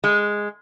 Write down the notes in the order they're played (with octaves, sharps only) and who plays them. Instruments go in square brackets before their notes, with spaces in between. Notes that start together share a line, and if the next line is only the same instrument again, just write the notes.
[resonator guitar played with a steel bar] G#3